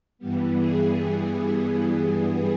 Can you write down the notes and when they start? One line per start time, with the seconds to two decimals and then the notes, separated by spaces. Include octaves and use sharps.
0.19 G2 E3 G3 B3
0.55 G#4
1.66 G#4
2.03 G#4